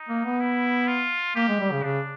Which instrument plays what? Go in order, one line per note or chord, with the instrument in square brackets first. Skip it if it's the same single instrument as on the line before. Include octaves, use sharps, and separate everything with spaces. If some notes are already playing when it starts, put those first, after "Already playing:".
Already playing: [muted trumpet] D#4
[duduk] A#3
B3
[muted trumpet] E4
F4
[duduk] A#3 [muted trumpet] G4
[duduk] G#3
G3
C#3
[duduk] C#3 [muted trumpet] D4